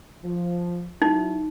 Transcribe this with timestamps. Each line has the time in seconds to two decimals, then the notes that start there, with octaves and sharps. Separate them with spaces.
0.23 F3
1.02 F#3 D#4 E4